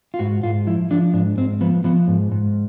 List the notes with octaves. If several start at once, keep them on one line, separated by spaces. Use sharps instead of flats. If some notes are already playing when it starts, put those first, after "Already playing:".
F4
G#2 F#4
G#2 F4
F3 E4
F3 D4
G#2 D4
G#2 C4
F3 B3
F3 B3
G#2
G#2